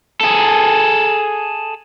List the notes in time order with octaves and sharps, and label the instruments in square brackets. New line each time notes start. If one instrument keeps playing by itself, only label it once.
[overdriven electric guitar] G#4 A4